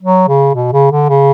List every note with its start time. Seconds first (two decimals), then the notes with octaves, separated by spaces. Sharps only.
0.02 F#3
0.28 C#3
0.55 B2
0.73 C#3
0.91 D3
1.09 C#3